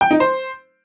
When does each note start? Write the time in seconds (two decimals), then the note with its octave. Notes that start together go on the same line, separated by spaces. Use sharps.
0.01 G5
0.11 D#4
0.20 C5